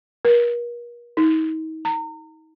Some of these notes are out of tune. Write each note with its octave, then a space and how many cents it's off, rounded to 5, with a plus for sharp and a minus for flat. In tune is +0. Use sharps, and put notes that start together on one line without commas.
A#4 +40
D#4 +35
A#5 -35